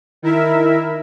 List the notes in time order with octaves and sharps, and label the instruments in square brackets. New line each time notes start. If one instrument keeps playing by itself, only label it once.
[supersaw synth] D#3 E4 A#4 E5